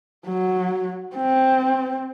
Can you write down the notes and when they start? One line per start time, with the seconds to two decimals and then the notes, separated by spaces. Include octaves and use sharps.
0.27 F#3
1.16 C4